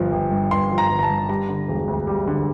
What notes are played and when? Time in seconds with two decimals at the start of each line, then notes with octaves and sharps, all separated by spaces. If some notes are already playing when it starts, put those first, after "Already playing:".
Already playing: G1 F3
0.12 G1
0.31 G2
0.51 G1 C6
0.71 F3
0.78 A#5
0.90 G1
0.99 A#5
1.03 A5
1.10 G2
1.29 G3 A#5
1.49 D3
1.68 E1
1.88 D2
2.07 G3
2.27 D3